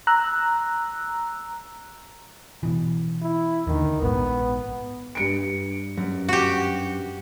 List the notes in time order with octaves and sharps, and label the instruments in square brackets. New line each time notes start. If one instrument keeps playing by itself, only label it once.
[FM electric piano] A#5 E6 F#6
[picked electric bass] B2 E3
[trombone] E4
[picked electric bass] D#2 D3 [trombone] D#3
[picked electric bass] A#1 G#2 [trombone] B3
[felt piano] G2 C#7 D7
[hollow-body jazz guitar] F#2
[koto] F#4 G4